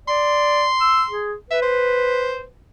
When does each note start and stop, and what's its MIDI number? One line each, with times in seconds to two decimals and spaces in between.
0.08 0.66 74
0.08 1.35 84
0.80 1.03 88
1.10 1.34 68
1.51 2.47 71
1.51 1.62 76
1.62 2.43 72